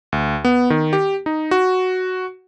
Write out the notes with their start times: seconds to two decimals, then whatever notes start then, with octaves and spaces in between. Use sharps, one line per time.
0.12 D2
0.45 B3
0.70 D#3
0.93 G4
1.26 D#4
1.51 F#4